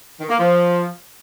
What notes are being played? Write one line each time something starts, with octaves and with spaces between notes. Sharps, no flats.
D#3
A#3
F3